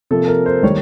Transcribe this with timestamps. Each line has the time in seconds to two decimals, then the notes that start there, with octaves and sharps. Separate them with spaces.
0.11 C3 F3 A#3 A4
0.28 A#4
0.46 C5
0.63 D#3 G3 A#3 C#5